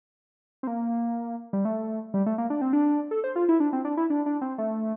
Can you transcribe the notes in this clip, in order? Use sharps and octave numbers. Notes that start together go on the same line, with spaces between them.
C4
A#3
G3
A3
G3
A3
A#3
D4
C4
D4
A4
C5
F4
E4
D4
C4
D4
E4
D4
D4
C4
A3